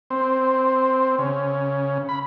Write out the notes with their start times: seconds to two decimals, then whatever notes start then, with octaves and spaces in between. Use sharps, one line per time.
0.11 C4
1.18 C#3
2.09 B5